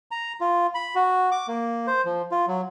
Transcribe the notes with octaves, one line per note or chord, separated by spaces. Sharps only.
A#5
F4
B5
F#4
D6
A#3
C5
F3
F4
F#3